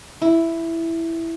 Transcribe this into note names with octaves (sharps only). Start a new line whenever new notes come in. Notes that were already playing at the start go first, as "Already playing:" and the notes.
E4